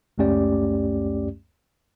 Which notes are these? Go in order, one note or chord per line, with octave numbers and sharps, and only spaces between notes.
C#2 F#2 A3 C#4 G4 D5